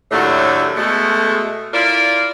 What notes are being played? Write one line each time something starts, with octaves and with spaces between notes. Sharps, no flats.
D#2 A2 F#3 A3 D4
B2 G#3 A3
E4 F4 A#4 D5